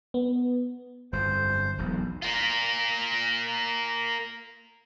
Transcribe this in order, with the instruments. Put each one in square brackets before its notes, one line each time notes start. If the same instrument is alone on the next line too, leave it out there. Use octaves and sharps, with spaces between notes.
[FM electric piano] B3
[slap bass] G1 F2 [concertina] C5
[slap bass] E1 B1 F2
[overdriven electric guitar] A#3 F4